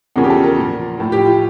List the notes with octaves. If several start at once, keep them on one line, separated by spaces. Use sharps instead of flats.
E2 C#3 F3 A#4
G4
A4
A#4
A#2 F3
A2 F3
G4
F4